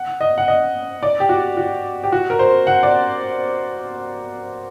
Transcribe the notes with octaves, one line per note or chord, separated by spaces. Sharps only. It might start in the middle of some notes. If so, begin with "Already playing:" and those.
Already playing: F#5
D#5
F#5
D#5
D5
G4
F#4
F#4
G4
F#4
A#4
C5
F#5
D5